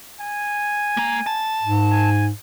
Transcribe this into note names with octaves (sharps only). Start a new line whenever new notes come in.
G#5
A#3 A#5
A5
G#2
G#5